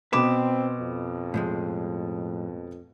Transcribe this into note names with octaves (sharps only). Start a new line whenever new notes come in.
B2 C4 B4 D6 E7
F2
A2 F3 G#3